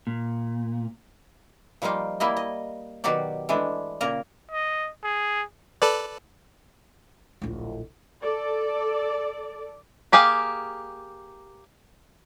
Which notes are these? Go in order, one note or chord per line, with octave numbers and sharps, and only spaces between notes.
A#2
F3 G3 A#3 D#4 F4
G3 A#3 E4 D#5
D#5
B2 D#3 F#3 F#4 G4 D5
E3 G#3 A3 D4
A#2 C#3 A#3 A#4 A#5
D#5
G#4
A4 B4 D5
D1 A#1
A4 D5
A#3 G4 G#4 F5 G#5